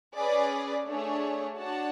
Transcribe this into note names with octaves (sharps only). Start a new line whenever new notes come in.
C#4 G#4 B4 D5
A3 D4 G#4 C#5
D4 F#4 C#5 F#5 A5